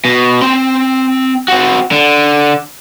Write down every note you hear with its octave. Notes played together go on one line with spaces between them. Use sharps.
B2
C4 C6
C4 F#4
D3